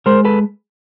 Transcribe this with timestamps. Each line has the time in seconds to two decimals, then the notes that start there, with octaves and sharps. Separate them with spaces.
0.06 G#3 A#4 C5
0.25 A4 B4